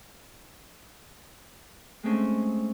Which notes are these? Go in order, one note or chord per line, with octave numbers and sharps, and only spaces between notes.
G#3 A3 C4 C#4